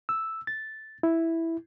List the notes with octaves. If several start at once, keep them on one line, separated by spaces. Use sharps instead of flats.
E6
A6
E4